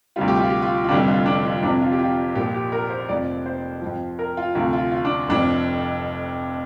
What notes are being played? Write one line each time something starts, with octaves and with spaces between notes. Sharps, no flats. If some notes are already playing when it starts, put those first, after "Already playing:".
D2 C3 G3 F4
G4
F4
G4
F4
F4
F1 F2 D3 G3 D4
F4
D4
F4
F2 C3 F3 D4
F4
G4
F4
A#1 A#2 F3 G4
G4
A#4
C5
F1 F2 F3 D5
C5
F2 F3
A#4
F4
D2 C3 F3 F4
F4
F4
D4
F1 F2 F3 D4